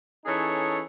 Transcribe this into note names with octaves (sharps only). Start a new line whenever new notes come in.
E3 C#4 D#4 G#4 A4 C#5